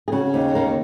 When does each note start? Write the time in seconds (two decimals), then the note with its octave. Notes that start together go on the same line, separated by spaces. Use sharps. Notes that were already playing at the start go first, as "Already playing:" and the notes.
0.08 G#4
0.12 C#3 F#4
0.34 D#2
0.55 C#3 A#3